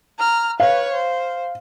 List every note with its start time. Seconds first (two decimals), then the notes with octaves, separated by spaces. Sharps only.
0.18 A#5 F6
0.60 B4 C#5 F5
0.93 C5